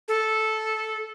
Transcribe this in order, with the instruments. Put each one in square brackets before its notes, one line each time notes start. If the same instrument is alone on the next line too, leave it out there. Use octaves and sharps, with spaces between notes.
[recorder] A4